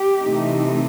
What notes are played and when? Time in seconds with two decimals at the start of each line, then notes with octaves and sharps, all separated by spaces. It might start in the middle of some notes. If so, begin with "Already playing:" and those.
Already playing: G4
0.20 C3 E3 A3 C4 D#4